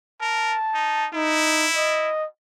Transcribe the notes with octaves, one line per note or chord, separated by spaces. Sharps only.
A#4 A5
D#4
D#4 E4
D#5